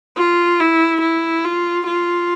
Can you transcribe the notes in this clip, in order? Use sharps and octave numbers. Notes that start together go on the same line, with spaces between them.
F4
E4
E4
F4
F4